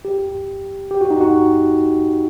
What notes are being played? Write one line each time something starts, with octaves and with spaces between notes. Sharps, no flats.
G4
G4
F#4
D#4
F#4